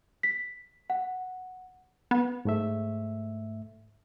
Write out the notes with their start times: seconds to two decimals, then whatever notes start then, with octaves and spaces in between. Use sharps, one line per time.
0.23 B6
0.90 F#5
2.11 B3
2.45 G#2 A3 E5